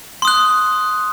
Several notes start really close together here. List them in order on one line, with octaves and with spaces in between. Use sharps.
C6 D#6 F#6